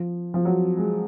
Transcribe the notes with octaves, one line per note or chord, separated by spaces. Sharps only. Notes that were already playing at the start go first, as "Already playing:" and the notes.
Already playing: F3
F3
F#3
G#3